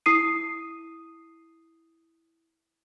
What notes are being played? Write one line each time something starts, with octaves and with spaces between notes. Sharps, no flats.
E4 D#6 C7 D#7